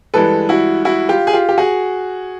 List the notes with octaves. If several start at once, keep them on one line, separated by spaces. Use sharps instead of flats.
G2 E3 G#3 A4 B4
E4 F#4
E4 F#4
F4 G4
G#4
F4 G4
G4
F#4 G#4